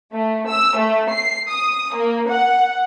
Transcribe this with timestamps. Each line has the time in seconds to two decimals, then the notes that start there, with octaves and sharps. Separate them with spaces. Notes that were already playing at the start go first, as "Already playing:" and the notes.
0.13 A3
0.48 E6
0.77 A3
1.10 C7
1.51 D#6
1.95 A#3
2.29 F#5